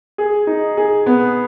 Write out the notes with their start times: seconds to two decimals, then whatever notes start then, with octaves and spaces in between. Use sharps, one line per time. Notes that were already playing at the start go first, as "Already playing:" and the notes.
0.18 G#4
0.47 D#4
0.77 G#4
1.06 B3